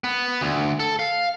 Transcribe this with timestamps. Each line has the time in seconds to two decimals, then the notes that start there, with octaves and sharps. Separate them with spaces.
0.04 B3
0.41 D2
0.80 A4
0.99 F5